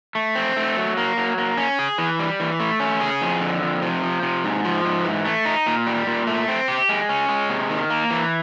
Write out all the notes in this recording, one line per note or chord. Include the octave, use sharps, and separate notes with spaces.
A3
C4
A3
F#3
A#3
F#3
A#3
C#4
G#4
E3
G3
E3
A3
C#4
G#4
F2
D3
F2
C3
F3
C3
G#2
F3
G#2
E3
A3
D#4
A#2
G3
A#2
A3
C4
G4
G#3
C#4
G#3
C3
D#3
A#3
E3